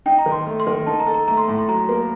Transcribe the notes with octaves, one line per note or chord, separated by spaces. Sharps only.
D#4 G5
A#5
D#3
C6
A3
C6
D#3
D#4 A5
A#5
A4
A#5
A3 A#5
C6
A2
C6
F#3 A#5
A#3